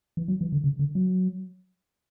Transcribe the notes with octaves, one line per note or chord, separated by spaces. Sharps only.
E3
F#3
E3
D3
C#3
D3
F#3